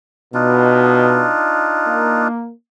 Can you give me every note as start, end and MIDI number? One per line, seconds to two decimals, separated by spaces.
0.34 1.29 47
0.34 2.28 62
0.34 2.28 63
0.34 2.28 65
1.88 2.52 58